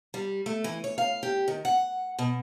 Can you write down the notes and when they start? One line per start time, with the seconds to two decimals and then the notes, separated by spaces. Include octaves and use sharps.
0.14 G3
0.46 A3
0.64 E3
0.84 C#5
0.98 F5
1.23 G4
1.48 D#3
1.65 F#5
2.19 B2